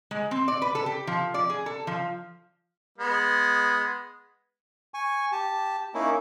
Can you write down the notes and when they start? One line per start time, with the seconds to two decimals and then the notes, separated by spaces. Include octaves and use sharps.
0.11 G#3
0.31 C4
0.48 D5
0.62 B4
0.75 A4
0.86 G4
1.07 F3
1.34 D5
1.49 G#4
1.66 A4
1.87 F3
2.98 G#3 B3
4.94 G#5 C#6
5.32 G4 A5
5.94 A#3 C#4 D#4 E4